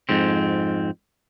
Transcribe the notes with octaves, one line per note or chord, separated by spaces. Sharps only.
F2 G#2 C4